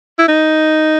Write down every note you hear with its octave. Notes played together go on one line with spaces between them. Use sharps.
E4
D#4